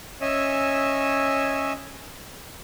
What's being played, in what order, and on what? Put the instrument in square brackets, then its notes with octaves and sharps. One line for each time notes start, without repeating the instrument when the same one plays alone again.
[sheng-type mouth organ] C#4 C#5 D#5 E5 G#5 E6